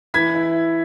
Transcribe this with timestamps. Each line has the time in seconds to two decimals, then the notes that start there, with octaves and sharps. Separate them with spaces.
0.14 E3 G#6 B6
0.35 E4